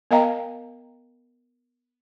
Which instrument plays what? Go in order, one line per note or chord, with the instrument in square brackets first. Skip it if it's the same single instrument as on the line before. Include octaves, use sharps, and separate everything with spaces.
[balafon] B3 A#4 D#5 F5 G5 A#5